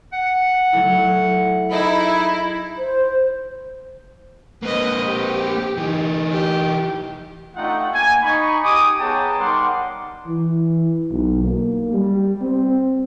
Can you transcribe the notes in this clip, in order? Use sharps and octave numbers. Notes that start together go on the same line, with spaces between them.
F#5
F#3 A3 E4
D#4 E4 G#4 D#5
C5
A#3 C4 B4 D#5
G4
E3 D#4
G4
A3 D4 D#4 F4 F#5 G5
A#3 G#5
D#4 B5 C#6
D#4 G4 G#5 D6 D#6
B3 G#4 C#5 G5 A5 A#5
G3 D#4 A#4 F#5 C6 D6
E3
B1
A#3
G3
C4